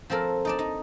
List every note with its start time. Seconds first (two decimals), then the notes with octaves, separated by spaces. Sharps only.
0.10 F3 C4 A4 A#4
0.45 D#4 D5 A5
0.59 D#4